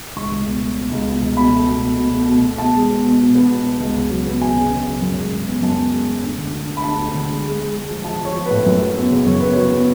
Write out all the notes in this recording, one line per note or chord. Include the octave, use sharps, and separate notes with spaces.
C#2 C#6
C#2
B2
A3
B2
C#2
B2
C#2
B2 B5
A3
B2
B2
B2
A3
B2
B2
B2 A5
G#3
B3
B2
B2
B3
B2
B3
C#2
C#3
F#3
B3
F#3 G#5
C#3
C#3
F#3
F#2
G#3
C#3
B3
F#2 A5
B3
G#3
G#3
D2
D3
D2
D2
B5
D2 A5
D2
D3
G#3
G#3
G#3
G#3
F3
F3 A5
F3 C#5
F3
A2 B4
F#2
F#3
B3
C#3
F#2 C#5
B3 B4
F#3 C#5
B3